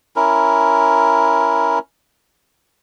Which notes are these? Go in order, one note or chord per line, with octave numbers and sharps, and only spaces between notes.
C#4 E4 A#4